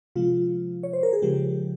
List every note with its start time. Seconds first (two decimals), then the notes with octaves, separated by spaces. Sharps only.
0.16 C3 F3 G#3 F4
0.83 C#5
0.93 C5
1.03 A#4
1.13 G#4
1.22 C#3 F3 G#3 G4